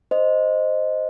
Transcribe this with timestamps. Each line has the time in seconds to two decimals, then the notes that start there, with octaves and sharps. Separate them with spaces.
0.11 C5 D#5